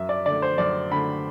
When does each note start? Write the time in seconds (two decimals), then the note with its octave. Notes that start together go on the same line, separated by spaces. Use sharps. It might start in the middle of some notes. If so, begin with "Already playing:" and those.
Already playing: F#2 E5
0.09 D5
0.26 D3 A3 D5
0.42 C5
0.58 F#2 D5
0.91 D3 A3 B5